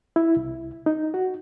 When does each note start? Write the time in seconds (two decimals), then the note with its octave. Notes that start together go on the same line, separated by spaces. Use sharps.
0.16 E4
0.36 C2
0.86 D#4
1.14 F#4